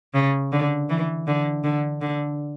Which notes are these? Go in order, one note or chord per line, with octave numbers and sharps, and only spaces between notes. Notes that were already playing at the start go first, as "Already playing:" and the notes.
C#3
D3
E3
D3
D3
D3